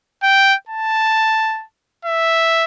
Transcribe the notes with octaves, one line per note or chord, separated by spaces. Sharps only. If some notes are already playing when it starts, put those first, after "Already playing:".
G5
A5
E5